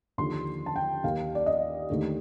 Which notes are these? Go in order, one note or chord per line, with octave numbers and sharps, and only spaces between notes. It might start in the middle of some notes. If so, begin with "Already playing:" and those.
D#2 D3 F3 C6
A5
G5
D#2 D#3 A#3 F5
D5
D#5
D#2 D3 A3